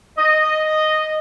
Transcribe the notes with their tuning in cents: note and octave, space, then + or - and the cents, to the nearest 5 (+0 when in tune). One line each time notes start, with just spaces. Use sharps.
D#5 -5